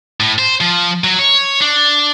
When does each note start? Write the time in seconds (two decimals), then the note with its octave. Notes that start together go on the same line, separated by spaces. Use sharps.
0.20 A2
0.39 C5
0.61 F3
1.04 F#3
1.19 C#5
1.61 D4